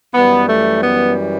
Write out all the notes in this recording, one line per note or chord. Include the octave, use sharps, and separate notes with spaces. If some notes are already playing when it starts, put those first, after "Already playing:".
F#2 E3 G3 B3
A3
B3